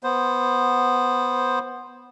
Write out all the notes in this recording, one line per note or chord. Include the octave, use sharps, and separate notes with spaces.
B3 C5